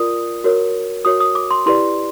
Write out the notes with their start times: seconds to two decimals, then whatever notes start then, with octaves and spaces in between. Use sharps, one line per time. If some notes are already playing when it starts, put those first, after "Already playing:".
Already playing: F4 A#4 D5 D#6
0.44 F#4 A#4 C#5
1.05 F#4 A#4 C#5 D#6
1.21 D#6
1.35 D6
1.51 C6
1.66 E4 G4 B4 D5 C6